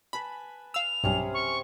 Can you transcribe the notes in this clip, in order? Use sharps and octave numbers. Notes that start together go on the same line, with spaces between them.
B4 G#5 A5 B5
F5 E6 F7
B1 G2 C3 C#4 G#4
C#6